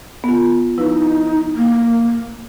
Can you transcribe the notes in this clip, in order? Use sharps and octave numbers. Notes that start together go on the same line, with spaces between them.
B3 F4
F3 D#4 E4 B4
A#3